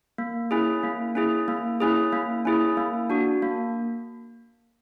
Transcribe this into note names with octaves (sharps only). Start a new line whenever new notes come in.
A#3
C#4 E4 G#4
A#3
C#4 E4 G#4
A#3
C#4 E4 G#4
A#3
C#4 E4 G#4
A#3
D4 F#4
A#3